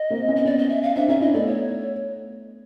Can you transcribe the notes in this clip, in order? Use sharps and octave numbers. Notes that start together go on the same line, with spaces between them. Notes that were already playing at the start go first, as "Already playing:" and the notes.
Already playing: D#5
A#3 C4
B3 C#4
D#5
B3 C#4 D5
D#5
E5
F5
C4 D4 E5
C#4 D#4 E5
D4 E4 D#5
A3 B3 D5
C#5